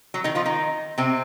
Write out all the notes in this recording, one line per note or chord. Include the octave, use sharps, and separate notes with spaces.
F#3
D#3 D#4
F3 F4
D#3 D#4
C3 C4